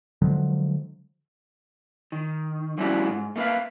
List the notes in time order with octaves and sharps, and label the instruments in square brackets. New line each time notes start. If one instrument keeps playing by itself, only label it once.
[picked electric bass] D3 F3 F#3 G#3
[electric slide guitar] D#3
F3 G3 A3 C#4 E4 F#4
G#2
A3 A#3 D4 B4 E5 F5